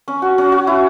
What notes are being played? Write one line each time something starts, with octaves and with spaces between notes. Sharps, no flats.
C#4
F#4
C#4
F#4
E4